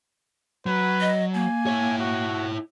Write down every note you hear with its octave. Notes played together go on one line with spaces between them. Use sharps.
F#3 B4
D#5
A#3 G#5
E4 C#5
F#4